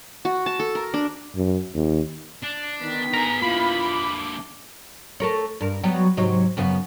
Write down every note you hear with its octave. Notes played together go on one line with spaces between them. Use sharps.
F#4
A5
A4
A#4
D4
F#2
D#2
D4
D3 D#3 B3 B6
G#4 A#4 A#5
D3 A#3 E4 F4 B5
D6
A3 A#4 C#5
G2 A#4
F#3 G3 B3
G#2 C3 F#3
F#2 C#3 B3